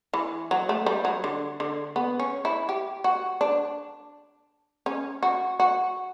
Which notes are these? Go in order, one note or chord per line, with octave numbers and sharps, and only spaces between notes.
E3
F#3
A3
G3
F#3
D3
D3
B3
C#4
E4
G4
F#4
D4
C#4
F#4
F#4